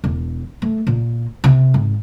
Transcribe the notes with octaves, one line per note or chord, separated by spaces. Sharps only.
E1
A3
A#2
C3
G#1